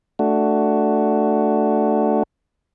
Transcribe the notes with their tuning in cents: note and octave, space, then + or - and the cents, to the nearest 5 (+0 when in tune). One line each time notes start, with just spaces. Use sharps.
A3 +0 D4 +0 F#4 +10